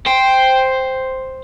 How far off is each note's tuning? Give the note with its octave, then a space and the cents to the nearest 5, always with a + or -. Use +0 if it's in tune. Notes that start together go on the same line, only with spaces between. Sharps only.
C5 +0 G5 +0